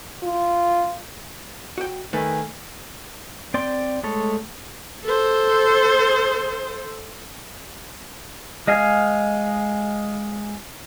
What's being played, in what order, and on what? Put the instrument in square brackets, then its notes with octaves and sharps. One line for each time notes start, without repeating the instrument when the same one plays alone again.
[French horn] F4
[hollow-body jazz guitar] F#4 G5
[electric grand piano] D#3 B4 [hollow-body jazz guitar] A3 [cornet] G#5
[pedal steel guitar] C4 D5 G5 C6
G#3 A3 A4 C#5
[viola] A4 C5
[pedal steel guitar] G#3 D#5 F5 G#5